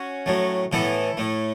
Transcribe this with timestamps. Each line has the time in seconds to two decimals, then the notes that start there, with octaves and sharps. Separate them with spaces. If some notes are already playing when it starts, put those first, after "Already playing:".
Already playing: C#4 F#4
0.26 A2 F#3 A3
0.72 A2 E3 B3 E4 A4
1.17 A2 A3